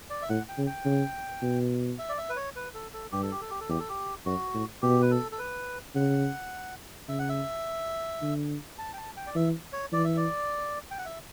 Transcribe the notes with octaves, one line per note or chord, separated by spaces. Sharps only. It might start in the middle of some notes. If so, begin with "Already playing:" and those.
D5
E5
A2 F#5
G5
C#3
G5
C#3
B2
E5
D5
E5
B4
C#5
B4
A4
A4
G2 G4
A4
G4
A4
G4
A4
E2 G4
A4
G4
F#2 F#4
A2
B2 G4
B4
A4
A4
B4
C#3 F#5
C#3 E5
F#5
E5
D3
A5
G5
A5
G5
D5
E3 E5
C#5
E3 D5
E5
D5
G5
F#5
E5